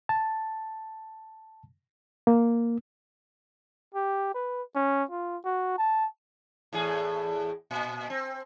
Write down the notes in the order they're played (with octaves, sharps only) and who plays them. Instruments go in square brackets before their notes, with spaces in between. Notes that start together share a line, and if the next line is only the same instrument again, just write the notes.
[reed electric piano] A5
A#3
[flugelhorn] G4
B4
C#4
F4
F#4
A5
[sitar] E2 A2 G#4
A#2
C4